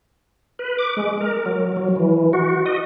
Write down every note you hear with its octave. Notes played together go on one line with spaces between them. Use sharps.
B4
D6
G#3
A#4
F#3
F#3
E3
F#4
D#5